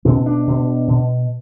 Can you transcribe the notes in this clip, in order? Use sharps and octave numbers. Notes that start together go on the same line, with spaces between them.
B2 C#4
D4
B2
B2